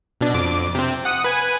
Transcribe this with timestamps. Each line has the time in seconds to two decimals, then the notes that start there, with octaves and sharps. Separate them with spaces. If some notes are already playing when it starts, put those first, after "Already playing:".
0.21 B2 D4
0.34 F2 D6
0.75 C3 C4
1.05 F#5 D#6
1.24 B4 G#5